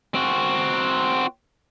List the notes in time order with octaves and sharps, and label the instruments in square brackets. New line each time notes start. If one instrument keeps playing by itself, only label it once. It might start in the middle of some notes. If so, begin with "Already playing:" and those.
[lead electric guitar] C4 F#4